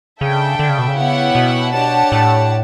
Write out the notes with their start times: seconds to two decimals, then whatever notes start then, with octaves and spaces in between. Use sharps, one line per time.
0.21 C#3 D4 A4 E5 G5
0.59 D3
0.69 C#3
0.79 B2
0.88 C#3
0.97 B3 E4 G4 C#5 F#5
1.35 B2
1.73 D4 G4 C#5 F#5 A5
2.12 A2